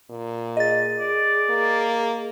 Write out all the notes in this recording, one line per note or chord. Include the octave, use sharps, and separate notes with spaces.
A#2
G#4 D#5 A6
D5
A#3